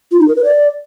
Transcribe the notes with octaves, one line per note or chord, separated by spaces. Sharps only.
F4
D#4
A#4
B4
D5